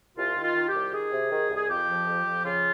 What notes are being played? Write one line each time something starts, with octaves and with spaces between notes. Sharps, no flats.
C2 F4
D#3
F4
D#3
G4
C2
D#3 G#4
C3
D#3
C2
G#4
F2 G4
F3
F2
F3
C#3 F4